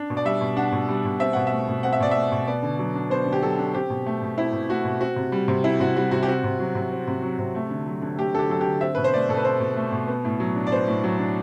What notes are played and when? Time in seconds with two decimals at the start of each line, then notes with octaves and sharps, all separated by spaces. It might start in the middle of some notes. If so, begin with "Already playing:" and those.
Already playing: D4
0.10 B2
0.17 D5
0.25 G3 E5
0.41 B2
0.56 D4 F#5
0.72 B2
0.88 G3
1.05 B2
1.20 C4 E5
1.33 B2 F#5
1.47 A3 E5
1.68 B2
1.83 C4 F#5
1.93 E5
2.00 B2 D5
2.11 A3 E5
2.32 B2
2.47 B3 D5
2.63 D3
2.79 F#3
2.95 D4
3.10 B3 C5
3.26 D3
3.33 G4
3.42 F#3 A4
3.59 D4
3.75 C4 G4
3.90 B2
4.06 A3
4.22 B2
4.37 C4 E4
4.53 B2
4.69 A3 F#4
4.84 B2
5.00 C4 F#4
5.16 C3
5.32 G3
5.48 C3
5.64 C4 E4
5.80 C3 F#4
5.96 G3 F#4
6.11 C3 F#4
6.23 G4
6.28 C4 F#4
6.44 C3
6.60 F#3
6.75 C3
6.92 C4
7.08 C3
7.22 F#3
7.39 C3
7.55 A3
7.70 D3
7.86 F#3
8.02 D3
8.17 A3 G4
8.34 D3 A4
8.39 G4
8.49 F#3 A4
8.61 G4
8.65 D3
8.81 C4 E5
8.95 B2 B4
9.04 C5
9.14 A3 D5
9.29 B2 A4
9.37 B4
9.44 C4 C5
9.60 B2
9.77 A3
9.92 B2
10.08 B3
10.25 A2
10.40 F#3
10.56 D4
10.67 D5
10.72 B3 C5
10.87 A2
11.04 F#3
11.19 D4